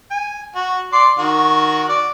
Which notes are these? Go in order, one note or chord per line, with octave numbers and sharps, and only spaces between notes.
G#5
F#4
D5 C6 D6
D#3 F#4 C#6
D5